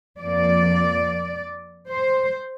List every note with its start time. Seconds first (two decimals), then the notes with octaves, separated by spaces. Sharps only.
0.20 F2 F3 A#3 D5
1.89 C5